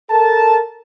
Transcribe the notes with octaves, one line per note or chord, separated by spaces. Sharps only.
A4 A#4 A5